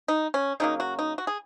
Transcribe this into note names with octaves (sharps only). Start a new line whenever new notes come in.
D#4
C#4
C#3 F#3 A#3 D#4
F#4
D#4
F#4
G#4